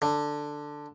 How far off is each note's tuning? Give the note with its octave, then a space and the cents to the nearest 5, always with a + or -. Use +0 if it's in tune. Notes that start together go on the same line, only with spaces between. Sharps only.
D3 +5